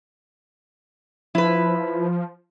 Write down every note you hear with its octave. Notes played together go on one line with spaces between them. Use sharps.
F3 E4 B4